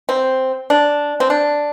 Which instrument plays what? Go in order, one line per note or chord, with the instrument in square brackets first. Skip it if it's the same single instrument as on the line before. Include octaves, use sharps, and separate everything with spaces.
[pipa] C4
D4
C4
D4